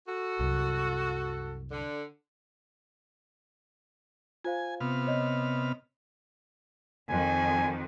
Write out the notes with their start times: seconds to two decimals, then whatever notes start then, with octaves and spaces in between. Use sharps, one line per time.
0.07 F#4 A4
0.39 C2 F#2
1.71 D3
4.45 F4 C5 F5 G#5
4.81 C3 B3 F6
5.07 C#5 D#5
7.09 F2 D#3 G#5